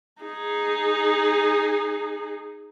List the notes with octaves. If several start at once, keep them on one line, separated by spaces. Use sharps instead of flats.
D#4 G#4